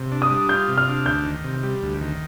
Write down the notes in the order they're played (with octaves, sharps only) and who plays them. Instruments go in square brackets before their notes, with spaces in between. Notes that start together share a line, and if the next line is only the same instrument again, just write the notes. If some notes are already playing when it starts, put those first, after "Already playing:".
Already playing: [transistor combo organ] C3
D4
[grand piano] D#6
[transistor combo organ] G3
[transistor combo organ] F4 [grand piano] G6
[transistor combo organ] C3
[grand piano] F6
[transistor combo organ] D4
[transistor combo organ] D2 [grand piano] G6
[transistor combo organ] D#3
C3
G3
D2
D#3